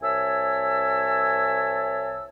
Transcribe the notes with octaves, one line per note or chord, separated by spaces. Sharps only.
C2 C#5 E5 G#5 A5 E6